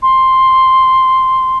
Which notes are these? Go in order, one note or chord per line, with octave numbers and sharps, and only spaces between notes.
C6